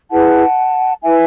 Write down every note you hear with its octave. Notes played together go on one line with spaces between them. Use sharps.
E4 G#4 B4 F#5 A5
E4 B4 E5 G#5